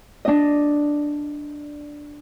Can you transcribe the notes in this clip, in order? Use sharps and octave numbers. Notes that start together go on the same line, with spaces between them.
D4 D#5